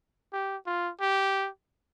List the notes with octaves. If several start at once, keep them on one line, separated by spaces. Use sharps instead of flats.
G4
F4
G4